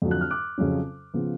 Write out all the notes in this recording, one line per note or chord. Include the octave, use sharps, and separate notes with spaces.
F2 D3 F#3
F#6
F6
D6 F#6
F2 C#3 F#3 C#4
C#3 F3 B3